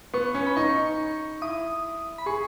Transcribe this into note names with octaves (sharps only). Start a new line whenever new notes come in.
B3 C#6
C#4
B5
D#4 C#6
E4 D#6
B5
G#4 C#6